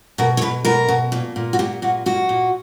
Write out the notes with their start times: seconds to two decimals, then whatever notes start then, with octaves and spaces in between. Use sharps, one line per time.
0.18 B2 A#4
0.37 C#5
0.41 B2 B4
0.65 B2 A#4
0.89 B2
1.12 A#2
1.36 A#2
1.53 F#4
1.59 A#2 G4
1.82 A#2 F#4
2.06 A#2 F#4
2.29 A#2